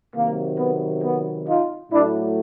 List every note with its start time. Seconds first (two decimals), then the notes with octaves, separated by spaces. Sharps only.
0.15 C3 D#3 F#3 A#3
0.58 B3
1.04 B3
1.47 D#4 F4
1.91 A2 F#3 A3 D4 E4